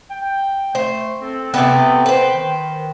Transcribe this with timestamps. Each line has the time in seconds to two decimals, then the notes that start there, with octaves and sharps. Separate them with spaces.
0.10 G5
0.75 A3 C5
1.21 C4 A4
1.54 C3 A3 B3 G5
2.06 B4 C5
2.34 D#3